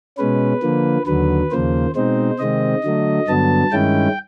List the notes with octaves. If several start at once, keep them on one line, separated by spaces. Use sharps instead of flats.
B2 G#3 C#4 B4
D3 F3 A#3
D#2 D3 F#3 B4
D#2 C#3 F3 A#3 C5
B2 G#3 C4 D#4 C5
C3 D#3 G#3 C4 D#5
D3 F#3 A3
G2 D3 F#3 B3 A5
G2 D#3 G#3 C#4 E4 G5